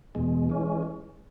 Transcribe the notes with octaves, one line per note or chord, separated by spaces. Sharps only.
E2 B2 G#3
E3 G#3 C#4